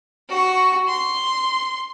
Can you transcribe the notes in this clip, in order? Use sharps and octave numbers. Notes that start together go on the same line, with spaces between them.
F#4 C#6
C6